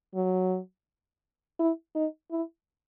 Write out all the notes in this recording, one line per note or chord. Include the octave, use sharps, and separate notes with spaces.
F#3
E4
D#4
E4